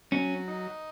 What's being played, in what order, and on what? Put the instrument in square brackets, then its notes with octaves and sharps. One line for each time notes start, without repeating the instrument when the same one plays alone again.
[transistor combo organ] F#3 [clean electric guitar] C#4
[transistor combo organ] D#4